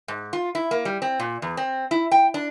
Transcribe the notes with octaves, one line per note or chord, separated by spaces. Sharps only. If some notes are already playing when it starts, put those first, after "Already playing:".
G#2
F4
E4
A#3
G3
C4
A#2
E2
C4
E4
G5
D4